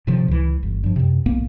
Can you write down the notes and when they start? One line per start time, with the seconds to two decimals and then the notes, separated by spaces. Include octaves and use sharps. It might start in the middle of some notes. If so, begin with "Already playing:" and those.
0.07 A2 C3 D#3 F3
0.28 C#2 E3
0.63 G1
0.83 G2 F3
0.96 F#2 C3
1.26 B1 A2 A#3 B3